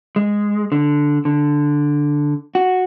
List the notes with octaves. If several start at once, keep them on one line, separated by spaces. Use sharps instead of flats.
G#3
D3
D3
F#4